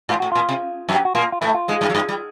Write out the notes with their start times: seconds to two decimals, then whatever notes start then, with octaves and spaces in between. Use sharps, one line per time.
0.09 G#2 F4
0.20 A2 F#4
0.32 A#2 F4
0.49 C3
0.89 F#2 F#3
0.94 G4
1.05 F#4
1.15 A#2 A#3 F4
1.32 F4
1.41 A2 A3 E4
1.54 F4
1.68 G#2 G#3
1.81 G2 G3
1.90 F#3
1.95 G2 G3
2.09 G3